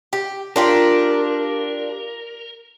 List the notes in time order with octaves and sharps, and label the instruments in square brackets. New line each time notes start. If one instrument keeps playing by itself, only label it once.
[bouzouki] G4
[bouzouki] D4 F4 G4 [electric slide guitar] A#4